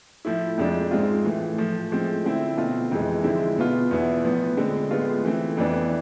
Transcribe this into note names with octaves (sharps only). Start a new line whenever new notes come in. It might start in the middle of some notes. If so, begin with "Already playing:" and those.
A2 F3 A3 E4
F2 C3 F3 G#3 D4
G#2 G#3 C4 F4
A2 E3 A3
A2 F3 A3
A2 F3 G#3 C4
D3 A3 C4 E4
B2 A3 C4 F4
F2 C3 E3 G#3
D3 F3 G#3 C4 E4
B2 B3 F4
E2 B2 B3 E4
A2 F3 B3
D3 G#3 C4
A2 G#3 B3 F4
E3 A3 C4
F2 E3 B3 D4